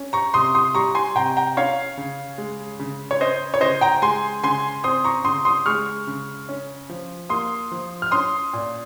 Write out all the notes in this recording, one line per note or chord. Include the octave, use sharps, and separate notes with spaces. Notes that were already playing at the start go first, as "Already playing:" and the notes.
Already playing: C#4
A#5 C#6
C3 C6 D#6
C6 D#6
G3 A#5 C#6
G#5 C6
C3 G5 A#5
G5 A#5
C#4 C#5 F5
C#3
G#3
C#3
C#5
C#4 C5 D#5
C#5
C#3 C5 D#5
G5 A#5
G#3 G#5 C6
C#3 G#5 C6
C4 C6 D#6
A#5 C#6
C#3 C6 D#6
C6 D#6
G#3 C#6 F6
C#3
C#4
F3
A#3 C6 D#6
F3
F6
C#4 C6 D#6
A#2